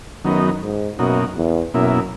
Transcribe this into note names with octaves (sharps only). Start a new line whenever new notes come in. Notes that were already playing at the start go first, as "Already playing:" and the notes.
F#2 D#3 F#3 B3 D#4
G#2
F#2 B2 A#3 D#4 F#4
E2
F#2 B2 A#3 E4